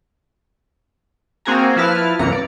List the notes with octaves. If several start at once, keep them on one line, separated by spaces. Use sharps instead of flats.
A#3 C4 F#4 G#4 G#5 A#5
F3 E4 B4 A5 F6
C2 F#2 E3 A#3 A#5 C#7
D5